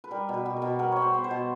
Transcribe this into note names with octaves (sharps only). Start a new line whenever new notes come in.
B4
G3 A#4
B2
B4
B2
A#4
B2
B3 A#4
B3 C#5
C5
B3
C5
B2